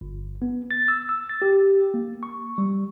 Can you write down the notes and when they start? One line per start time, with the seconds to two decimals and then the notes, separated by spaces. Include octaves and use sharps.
0.01 G1
0.42 B3
0.71 A6
0.88 E6
1.09 E6
1.29 A6
1.42 G4
1.94 A#3
2.23 C#6
2.58 G3